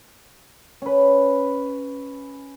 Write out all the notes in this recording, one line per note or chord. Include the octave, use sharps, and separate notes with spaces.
C#4 B4